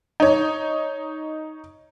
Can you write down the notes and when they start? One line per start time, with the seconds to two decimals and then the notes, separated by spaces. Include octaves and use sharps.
0.20 D#4 C#5